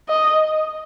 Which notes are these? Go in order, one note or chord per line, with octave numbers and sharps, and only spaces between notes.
D#5